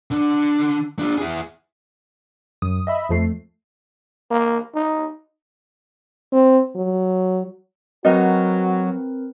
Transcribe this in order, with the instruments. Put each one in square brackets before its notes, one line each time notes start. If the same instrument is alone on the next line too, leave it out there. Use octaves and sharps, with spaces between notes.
[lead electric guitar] D3 D4
D4 F4
E4 G#4
[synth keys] F#2 D#6
D#5 E5 B5
F2 F3 A3 C7
[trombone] A#3
D#4
[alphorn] C4
F#3
[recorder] F#3 [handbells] C4 A#4 B4 [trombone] F#4 [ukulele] D#5